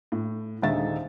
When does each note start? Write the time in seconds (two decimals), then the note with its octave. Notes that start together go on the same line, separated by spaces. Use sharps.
0.12 A2
0.62 D#1 D3 G#3 D#4 E5 A6